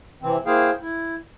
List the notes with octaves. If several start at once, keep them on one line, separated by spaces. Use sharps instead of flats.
C3 E3 C4
A#3 E4 G#4 C5 F5 G5
E4